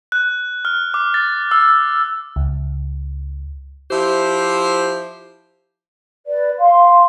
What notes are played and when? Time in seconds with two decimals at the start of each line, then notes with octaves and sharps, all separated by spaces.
0.12 F#6
0.65 F6
0.94 D6
1.14 A6
1.51 E6
2.36 C#2
3.91 F3 E4 G4 C5
6.27 B4 D5
6.59 F5 C6